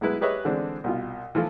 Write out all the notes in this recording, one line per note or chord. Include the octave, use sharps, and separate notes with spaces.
B1 G#3 E4 B4
G4 G#4 B4 C#5 D#5 E5
D3 E3 G#3 C4 D4
C2 B2 F4
E3 F3 F4 A4